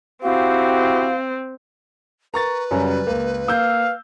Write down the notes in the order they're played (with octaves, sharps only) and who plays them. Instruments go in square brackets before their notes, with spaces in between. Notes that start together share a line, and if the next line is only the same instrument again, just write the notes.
[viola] C4 [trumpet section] E4 F#4 G4 [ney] F5
[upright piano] A#4 [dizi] B4 [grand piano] A#5 C#6 A6
[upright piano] F#2 [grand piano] C#3 F#3 G3
[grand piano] C#2 [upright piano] A#3
[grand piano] A#3 G6 [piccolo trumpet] F5 [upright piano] E6